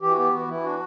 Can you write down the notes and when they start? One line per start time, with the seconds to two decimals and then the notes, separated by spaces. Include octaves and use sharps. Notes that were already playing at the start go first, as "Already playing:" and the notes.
0.02 E3 G4
0.11 F#4
0.17 B3 G4
0.33 E3 F#4
0.48 E3 E4
0.64 D4 F#4